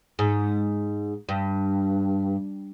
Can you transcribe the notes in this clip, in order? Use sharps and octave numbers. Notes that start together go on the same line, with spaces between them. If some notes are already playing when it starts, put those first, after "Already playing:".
G#2
G2